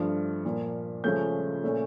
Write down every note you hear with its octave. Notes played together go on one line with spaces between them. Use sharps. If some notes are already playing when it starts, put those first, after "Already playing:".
Already playing: G2 F3 A3
A#2 F3 A#3
C#2 C#3 F3 A3 C#4 G6
A#2 A3 C#4